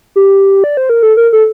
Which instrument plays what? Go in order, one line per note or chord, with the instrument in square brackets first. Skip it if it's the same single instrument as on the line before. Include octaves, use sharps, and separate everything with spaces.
[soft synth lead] G4
D5
C5
A#4
A4
A#4
A4